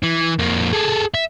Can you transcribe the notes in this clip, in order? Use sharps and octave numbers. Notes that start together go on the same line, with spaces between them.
E3
F2 A#3
G#4 A4
E5